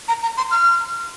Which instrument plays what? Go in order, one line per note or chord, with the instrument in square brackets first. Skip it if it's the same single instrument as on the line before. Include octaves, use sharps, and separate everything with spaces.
[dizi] A#5
A#5
C6
F6